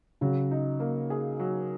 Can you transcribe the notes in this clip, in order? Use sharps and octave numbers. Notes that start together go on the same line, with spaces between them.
C#3 F#3
D#4
A#3
G#4
F#3